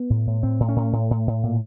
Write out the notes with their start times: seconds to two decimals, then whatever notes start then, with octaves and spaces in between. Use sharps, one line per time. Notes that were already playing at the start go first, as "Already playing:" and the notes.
Already playing: B3
0.10 A2
0.27 A2
0.43 A2 C4
0.60 A2
0.69 C#4
0.76 A2
0.93 A2
1.11 A2
1.27 A2
1.43 A#2